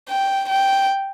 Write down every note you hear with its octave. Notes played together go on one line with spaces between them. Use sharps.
G5
G5